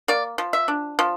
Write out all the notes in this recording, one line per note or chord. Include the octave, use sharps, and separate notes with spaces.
A#3 D5
F3
E5
D4
F3